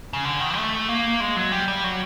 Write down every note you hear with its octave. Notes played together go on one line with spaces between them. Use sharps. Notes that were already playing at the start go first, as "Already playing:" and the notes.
C#3
D3
D#3
A3
A#3
G#3
F#3
G3
G3
F#3